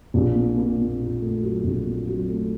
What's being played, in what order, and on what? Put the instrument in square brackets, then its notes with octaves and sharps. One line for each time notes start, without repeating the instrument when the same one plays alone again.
[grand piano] A#1
A#2
A#2
A#2
A#2
A3
F#3
A#1
A#2
F#3
A3